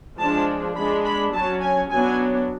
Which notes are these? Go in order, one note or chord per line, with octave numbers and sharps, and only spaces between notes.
F3 G#3 D4 A5
G#3 D4 B5
B5
F#3 C#4 A5
G#5
F#3 B3 D4 G#5